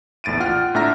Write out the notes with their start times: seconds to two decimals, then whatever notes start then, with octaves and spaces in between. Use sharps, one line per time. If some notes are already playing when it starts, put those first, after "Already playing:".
0.24 A#1 E2 A2 A6 D7 D#7
0.40 F4 F#5 G5 F6
0.75 A2 D4 E5 A#5 F6 A#6